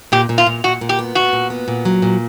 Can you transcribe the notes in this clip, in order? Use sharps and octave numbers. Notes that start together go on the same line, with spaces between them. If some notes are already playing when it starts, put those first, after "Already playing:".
A#2 G4
A#2
F4
A#2
A#2 F#4
A#2
G4
B3
A#2 F#4
A#2
B3
A#2
F#3
A#2